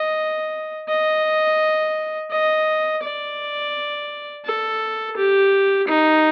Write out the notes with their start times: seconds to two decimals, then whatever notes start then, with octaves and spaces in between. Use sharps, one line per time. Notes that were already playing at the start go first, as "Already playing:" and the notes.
Already playing: D#5
0.89 D#5
2.31 D#5
3.03 D5
4.45 A4
5.17 G4
5.88 D#4